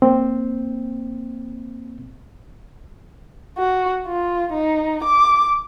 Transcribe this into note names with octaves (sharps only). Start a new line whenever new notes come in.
A#3 C4
F#4
F4
D#4
D6